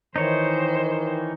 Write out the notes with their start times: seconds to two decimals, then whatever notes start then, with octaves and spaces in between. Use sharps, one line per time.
0.16 D#3 E3 D#4 C5 C#5